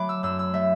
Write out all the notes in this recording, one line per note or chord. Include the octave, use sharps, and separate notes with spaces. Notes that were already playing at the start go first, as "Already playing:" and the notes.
Already playing: F#3 A3 B5 D6
E6
F#2 E6
E6
A3 E5